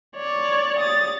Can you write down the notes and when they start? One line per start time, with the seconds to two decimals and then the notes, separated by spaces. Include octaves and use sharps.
0.16 C#5 D5
0.79 D#6 A6